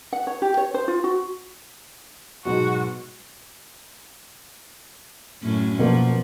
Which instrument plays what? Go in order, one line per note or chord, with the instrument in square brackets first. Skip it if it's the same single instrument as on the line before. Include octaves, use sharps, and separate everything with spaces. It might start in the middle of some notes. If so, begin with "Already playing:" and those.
[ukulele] F#5
C#5
G4
C#5
C5
F4
F#4
[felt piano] G#2 B2 F#3 [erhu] F#4
[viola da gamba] F#2 A2 C#4
[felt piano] B2 A#3 [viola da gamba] F3